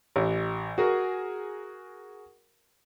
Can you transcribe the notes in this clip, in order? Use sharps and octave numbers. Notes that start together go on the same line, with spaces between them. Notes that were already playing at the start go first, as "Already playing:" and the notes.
A1
F#4 G#4 A#4